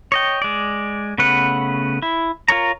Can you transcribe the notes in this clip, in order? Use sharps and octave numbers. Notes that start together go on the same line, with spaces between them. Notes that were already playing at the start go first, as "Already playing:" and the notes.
C#5 D#5 G5
G#3 D5
C#3 A3 B3 B4 F#5
E4
F4 A#4 C#5 A#5